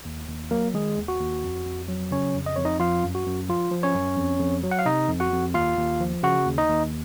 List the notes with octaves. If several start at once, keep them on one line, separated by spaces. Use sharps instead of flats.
D#2
D#2
F#3 A#3 A#4
D#3 G#3 G#4
D#2
F#4
D#2
F2
F2
F#3
C#3 C#4 C#5
F2
D#5
F2 C#5
D#4 D#5
F3 F4 F5
F#2
F#4
F#2
F3 F4
F3
C#4 C#5
F#2
F2
F2
F#3
F#5
F5
C3 D#4 D#5
F2
F#4 F#5
F2
D#2 F4 F5
D#2
F3
C#3 F#4 F#5
D#2
D#4 D#5
D#2